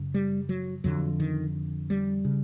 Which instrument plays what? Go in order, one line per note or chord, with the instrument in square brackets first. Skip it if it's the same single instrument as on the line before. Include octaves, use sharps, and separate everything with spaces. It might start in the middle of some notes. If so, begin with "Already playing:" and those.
Already playing: [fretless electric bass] F#2 C#3
G3
F#3
F2 D3 F#3
D#3
G3
C#3